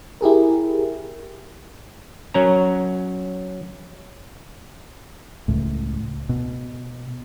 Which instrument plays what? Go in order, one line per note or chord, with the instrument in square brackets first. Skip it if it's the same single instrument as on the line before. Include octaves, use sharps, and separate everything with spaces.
[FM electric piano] E4 G4 G#4 A#4
[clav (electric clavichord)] F#3 C#4 A#5
[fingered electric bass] C#2 A2
B2